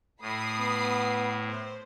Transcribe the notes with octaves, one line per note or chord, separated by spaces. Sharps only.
A2 B5 D#6 C7
B3
C5